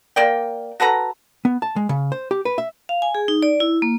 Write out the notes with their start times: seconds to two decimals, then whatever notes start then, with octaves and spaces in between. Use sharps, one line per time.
0.16 A#3 D5 G5
0.80 F#4 A4 B4 A#5
1.45 B3
1.62 A5
1.76 G#3
1.89 C#3
2.12 C5
2.31 G4
2.45 B4
2.58 E5
2.89 F5
3.02 G#5
3.15 G#4
3.28 D#4
3.43 D5
3.60 E4
3.82 A#3